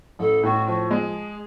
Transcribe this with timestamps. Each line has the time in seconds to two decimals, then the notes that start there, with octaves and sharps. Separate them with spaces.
0.19 A1 A4
0.43 A2 F#4
0.67 F3 F#4
0.91 G#3 G#4